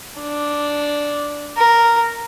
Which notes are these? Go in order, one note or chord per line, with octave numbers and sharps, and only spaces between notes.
D4
A#4